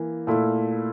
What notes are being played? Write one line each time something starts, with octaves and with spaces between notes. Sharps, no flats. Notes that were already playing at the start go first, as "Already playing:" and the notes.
Already playing: E3 A#3
A#2 A3 E4